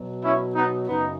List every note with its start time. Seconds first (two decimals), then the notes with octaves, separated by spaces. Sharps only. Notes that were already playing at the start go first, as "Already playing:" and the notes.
Already playing: B2 F#3
0.22 C#4 E4
0.54 B3 D#4
0.87 F#2 C#3 B3 D#4